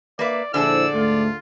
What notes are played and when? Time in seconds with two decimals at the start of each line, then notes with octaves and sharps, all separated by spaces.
0.19 A#3 B4 D5 E5
0.54 A#1 D3 E4 G#4 A4 C5 D5 E6
0.94 D2 G#2 A3 F4